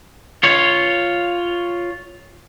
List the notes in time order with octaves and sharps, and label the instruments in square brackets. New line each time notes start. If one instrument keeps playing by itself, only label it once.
[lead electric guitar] F4 C#5